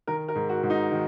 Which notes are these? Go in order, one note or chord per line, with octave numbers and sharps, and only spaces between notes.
D#3 A#4
A#4
G#2
F#4
G#2
D#4
D#3